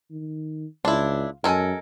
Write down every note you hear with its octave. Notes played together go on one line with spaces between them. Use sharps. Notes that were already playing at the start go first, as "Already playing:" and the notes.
D#3
C#2 D4 E4 F4
F#2 G#3 A4 A#4 C5 G#5